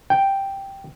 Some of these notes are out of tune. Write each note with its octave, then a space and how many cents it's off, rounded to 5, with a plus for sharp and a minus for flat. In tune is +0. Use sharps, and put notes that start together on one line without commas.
G5 +0